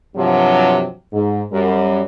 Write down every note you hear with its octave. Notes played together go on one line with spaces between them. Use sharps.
G2 C3 F3 F#3
G#2
F#2 G3